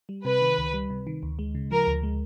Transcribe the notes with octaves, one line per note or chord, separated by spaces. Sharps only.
G3
C3 B4
D#3
C#2
G3
C3
D#3
D2
G#3
C#3
F3 A#4
D2
G#3